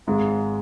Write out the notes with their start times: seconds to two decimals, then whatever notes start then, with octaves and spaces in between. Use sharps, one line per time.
0.07 G#1 G#2 G#3